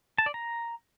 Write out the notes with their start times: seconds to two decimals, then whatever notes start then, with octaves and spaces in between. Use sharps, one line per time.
0.18 A5
0.26 D5
0.34 A#5